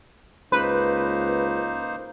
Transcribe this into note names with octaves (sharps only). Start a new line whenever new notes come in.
C#2 A#3 D#4 B4 C5